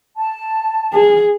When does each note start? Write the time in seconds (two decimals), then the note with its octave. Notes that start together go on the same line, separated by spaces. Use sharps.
0.17 A5
0.93 G#4